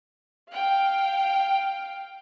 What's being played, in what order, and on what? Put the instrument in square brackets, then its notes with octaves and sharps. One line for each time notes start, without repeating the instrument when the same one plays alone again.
[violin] F5 G5